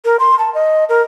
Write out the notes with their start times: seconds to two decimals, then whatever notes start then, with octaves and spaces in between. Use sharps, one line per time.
0.05 A#4
0.19 C6
0.39 A5
0.54 D#5
0.89 A#4